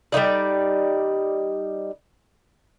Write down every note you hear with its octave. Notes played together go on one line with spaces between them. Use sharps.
G3 B3 D#4 D5